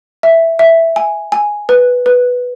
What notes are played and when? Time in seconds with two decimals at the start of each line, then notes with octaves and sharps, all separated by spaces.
0.23 E5
0.59 E5
0.96 G#5
1.32 G#5
1.69 B4
2.06 B4